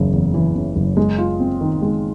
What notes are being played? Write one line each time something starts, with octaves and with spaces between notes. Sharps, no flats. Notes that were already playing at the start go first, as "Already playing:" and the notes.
Already playing: F#1 E2 C#3
E2
E3
C#3
F#1
G#3
F4
C4
D#3
G#3